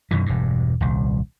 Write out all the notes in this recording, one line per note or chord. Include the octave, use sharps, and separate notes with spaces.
F#2 B2 D#3 E3
E1 G2
D#1 C2